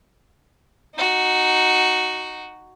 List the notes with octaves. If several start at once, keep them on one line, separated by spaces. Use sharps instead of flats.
D#4 F#4